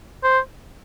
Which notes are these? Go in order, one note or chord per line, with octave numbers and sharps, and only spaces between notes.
C5